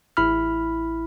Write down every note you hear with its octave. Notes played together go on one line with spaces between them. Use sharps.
A1 E4 B5 F6